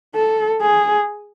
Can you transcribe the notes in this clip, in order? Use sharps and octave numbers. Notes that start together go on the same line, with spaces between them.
A4
G#4